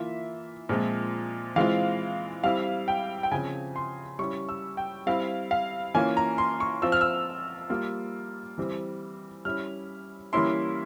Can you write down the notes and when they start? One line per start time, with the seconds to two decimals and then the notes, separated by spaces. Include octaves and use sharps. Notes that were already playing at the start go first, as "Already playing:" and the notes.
Already playing: E3 A#3 F4 E5
0.69 A#2 F3 G#3 C4
1.56 E3 G#3 C4 F4 F5
2.44 G3 C4 E4 F5
2.88 G5
3.23 G5
3.32 C#3 F3 C4 G#5
3.76 C6
4.19 G3 C#4 E4 C#6
4.49 E6
4.77 G5
5.07 G3 C4 E4 F5
5.51 F5
5.94 E3 A#3 C#4 F4 G#5
6.17 A#5
6.38 C6
6.60 C#6
6.82 F3 C4 F4 E6
6.92 F6
7.01 E6
7.70 G3 A#3 F4
8.58 E3 G3 C4
9.45 G3 C#4 E4 F6
10.33 E3 G3 A#3 C#4 E4 C6